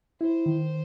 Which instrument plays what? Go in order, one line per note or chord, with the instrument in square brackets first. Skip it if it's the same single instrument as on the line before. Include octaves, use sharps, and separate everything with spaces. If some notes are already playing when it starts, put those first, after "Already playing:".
[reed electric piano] E4 [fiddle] C5
[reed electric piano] D#3